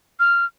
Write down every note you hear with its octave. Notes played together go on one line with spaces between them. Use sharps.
F6